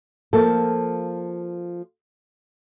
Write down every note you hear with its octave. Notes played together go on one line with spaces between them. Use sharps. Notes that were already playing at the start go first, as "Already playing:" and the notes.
F3 A#3 A4